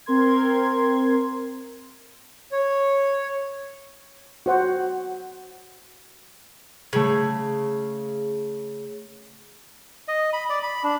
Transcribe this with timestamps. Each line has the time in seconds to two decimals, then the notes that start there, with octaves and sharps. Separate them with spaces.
0.06 C4 A#4 C6 G#6
2.52 C#5
4.46 F#4 C5 F#5
6.93 C#3 A3 G#6
10.08 D#5
10.33 B5
10.50 D5
10.63 B5
10.84 D4